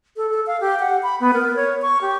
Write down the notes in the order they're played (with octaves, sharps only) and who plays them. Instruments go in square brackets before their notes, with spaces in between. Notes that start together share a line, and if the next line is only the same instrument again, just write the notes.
[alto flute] A4
A4
F5
G4
F#5
B5
B3
A#4
C#5
C#6
G4